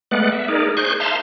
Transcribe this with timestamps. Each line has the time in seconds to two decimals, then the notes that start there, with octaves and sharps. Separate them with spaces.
0.11 G#3 A3 B3 B4 D5 F#5
0.32 E5
0.48 D#4 G#4 A#4 D5
0.77 G#4 C5 C#6 F#6 G6
1.00 E5 F5 A5 A#5 C6